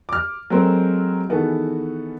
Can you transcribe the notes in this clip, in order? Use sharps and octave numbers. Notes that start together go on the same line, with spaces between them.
D6 F6
F#3 G#3 A3 C4 A#4 C5
D#3 E3 B3 F#4 G#4 A4